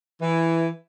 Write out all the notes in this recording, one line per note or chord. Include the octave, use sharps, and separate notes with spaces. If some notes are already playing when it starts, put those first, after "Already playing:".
E3